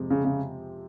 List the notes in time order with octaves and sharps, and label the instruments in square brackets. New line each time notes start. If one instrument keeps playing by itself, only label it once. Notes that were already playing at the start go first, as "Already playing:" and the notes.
Already playing: [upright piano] F2 C3 F3 G#3 C4
[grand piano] C#3
C#3